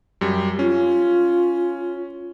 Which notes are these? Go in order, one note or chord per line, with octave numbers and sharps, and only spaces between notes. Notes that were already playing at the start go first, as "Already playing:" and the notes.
F#2 G3
C#4 F4